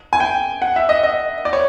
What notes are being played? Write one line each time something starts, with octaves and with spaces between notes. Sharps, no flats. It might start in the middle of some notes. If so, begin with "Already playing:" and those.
G#5
G5
F#5
E5
D#5
D#5
D5
C#5